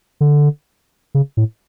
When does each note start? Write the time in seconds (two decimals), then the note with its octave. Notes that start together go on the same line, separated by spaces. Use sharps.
0.21 D3
1.15 C#3
1.37 A2